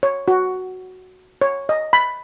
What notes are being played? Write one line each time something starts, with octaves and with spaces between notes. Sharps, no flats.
C#5
F#4
C#5
D#5
B5